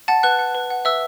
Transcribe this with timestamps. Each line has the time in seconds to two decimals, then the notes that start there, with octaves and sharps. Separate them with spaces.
0.08 F#5 A5 A6
0.23 B4 F#5 F#6
0.39 F#5
0.55 B4
0.70 F#5
0.85 B4 E5 E6